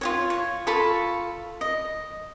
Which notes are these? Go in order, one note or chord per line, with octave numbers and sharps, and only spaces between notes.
F4 F#4 C#5
C#5
F4 A4 B5 C#6
D#5